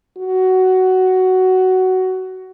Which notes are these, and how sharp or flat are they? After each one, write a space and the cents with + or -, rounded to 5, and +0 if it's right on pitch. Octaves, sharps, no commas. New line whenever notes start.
F#4 +15